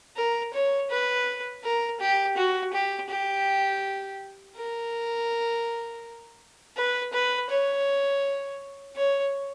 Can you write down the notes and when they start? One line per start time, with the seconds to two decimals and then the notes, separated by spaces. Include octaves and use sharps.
0.17 A#4
0.54 C#5
0.90 B4
1.64 A#4
2.00 G4
2.37 F#4
2.74 G4
3.10 G4
4.57 A#4
6.77 B4
7.13 B4
7.50 C#5
8.96 C#5